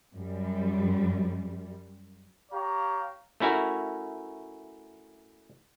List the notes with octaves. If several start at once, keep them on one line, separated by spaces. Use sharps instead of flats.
F#2 G3
G4 C#5 F5 A#5
A3 C#4 E4 F#4 A#4